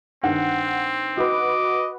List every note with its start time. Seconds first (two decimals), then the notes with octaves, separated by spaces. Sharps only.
0.24 G2 D#3 C4 F#5
1.17 F#4 B4 D#5 D6